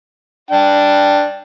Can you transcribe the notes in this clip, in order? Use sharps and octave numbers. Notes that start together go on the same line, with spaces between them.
D4 G5